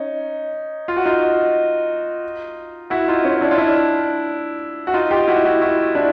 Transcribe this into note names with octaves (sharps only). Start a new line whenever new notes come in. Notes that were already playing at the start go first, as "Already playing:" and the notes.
Already playing: C#4 D#4
F4
F#4
D#4 F4
E4 F#4
D#4 F4
C#4 D#4
D4 E4
F4
D4 E4
F#4
D#4 F4
F4 G4
E4 F#4
E4 F#4
E4 F#4
D4 E4